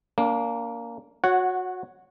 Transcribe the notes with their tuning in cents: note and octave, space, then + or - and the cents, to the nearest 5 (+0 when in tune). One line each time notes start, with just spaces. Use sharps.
A#3 +0 D4 -35
F#4 -20 C#5 +0 F#5 +0